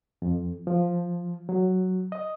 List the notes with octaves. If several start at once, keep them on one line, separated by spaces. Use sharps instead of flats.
F2
F3
F#3
D#5